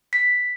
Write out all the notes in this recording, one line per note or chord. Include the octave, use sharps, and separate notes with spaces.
B6